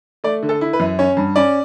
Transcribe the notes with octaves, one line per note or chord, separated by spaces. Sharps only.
A3 D5
D3
A4
E4
B4
F#2
C#4 C#5
G2
C#4 D5